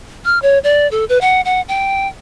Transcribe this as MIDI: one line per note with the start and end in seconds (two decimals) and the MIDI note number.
0.25 0.39 89
0.42 0.59 73
0.64 0.89 74
0.91 1.05 69
1.09 1.18 71
1.21 1.41 78
1.45 1.61 78
1.68 2.08 79